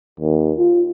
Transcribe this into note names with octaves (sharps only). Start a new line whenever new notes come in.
D#2
F4